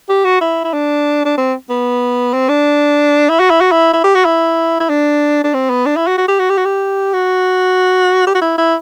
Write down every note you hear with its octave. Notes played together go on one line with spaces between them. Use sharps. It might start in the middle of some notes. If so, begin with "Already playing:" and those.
G4
F#4
E4
E4
D4
D4
C4
B3
C4
D4
E4
F#4
E4
F#4
E4
E4
G4
F#4
E4
E4
D4
D4
C4
B3
D4
E4
F#4
F#4
G4
F#4
G4
F#4
G4
F#4
G4
F#4
E4
E4